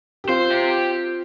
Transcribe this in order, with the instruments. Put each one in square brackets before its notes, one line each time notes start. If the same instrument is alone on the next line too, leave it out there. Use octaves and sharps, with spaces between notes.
[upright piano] G4
[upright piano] C4 F4 [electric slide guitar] C5
[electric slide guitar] G4